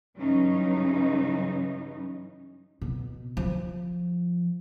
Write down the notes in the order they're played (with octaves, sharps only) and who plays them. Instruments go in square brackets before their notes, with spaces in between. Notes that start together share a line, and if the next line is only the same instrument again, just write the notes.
[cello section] G2 C#3 E3 F#3 C#4 D#4
[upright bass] B2
F3